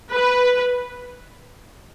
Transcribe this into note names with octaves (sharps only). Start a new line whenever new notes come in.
B4